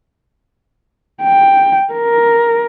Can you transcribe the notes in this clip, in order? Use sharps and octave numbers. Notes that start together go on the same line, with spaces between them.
G5
A#4